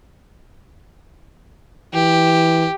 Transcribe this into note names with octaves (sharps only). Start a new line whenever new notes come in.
E3 G4